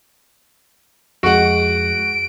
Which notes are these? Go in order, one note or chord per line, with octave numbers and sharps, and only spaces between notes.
F2 G#3 F#4 F#5 D7